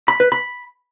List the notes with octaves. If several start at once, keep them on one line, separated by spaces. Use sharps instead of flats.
B5
B4
B5